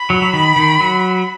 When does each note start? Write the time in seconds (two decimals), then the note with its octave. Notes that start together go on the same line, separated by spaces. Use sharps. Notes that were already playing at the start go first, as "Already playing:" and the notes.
Already playing: B5
0.10 F#3
0.22 F#3
0.33 D#3
0.56 D#3
0.80 F#3